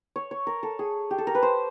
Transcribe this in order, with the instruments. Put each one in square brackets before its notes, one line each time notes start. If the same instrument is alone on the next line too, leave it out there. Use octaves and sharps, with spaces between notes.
[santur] C#5
C#5
A#4
A4
G#4
G4
A4
A#4
B4
C5